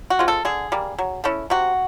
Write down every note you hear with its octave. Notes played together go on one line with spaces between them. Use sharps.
F#4
G#3 C4 F4
A4
D3 G#4
G3 A#3
F#3
A3 C#4 E4
C3 F#4